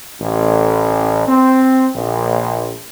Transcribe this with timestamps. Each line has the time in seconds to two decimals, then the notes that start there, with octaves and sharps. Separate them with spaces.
0.20 A1
1.27 C4
1.95 A#1